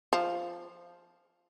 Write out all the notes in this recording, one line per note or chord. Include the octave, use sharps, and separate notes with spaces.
F3